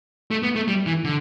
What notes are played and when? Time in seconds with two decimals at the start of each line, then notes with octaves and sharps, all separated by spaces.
0.31 A3
0.43 B3
0.55 A3
0.68 G3
0.86 E3
1.04 D3